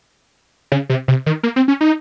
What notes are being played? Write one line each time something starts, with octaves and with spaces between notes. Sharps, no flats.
C#3
C3
C3
D#3
A#3
C4
C#4
D#4